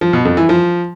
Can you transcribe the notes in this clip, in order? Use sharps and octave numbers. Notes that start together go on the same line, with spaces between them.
F3
B2
F2
E3
F3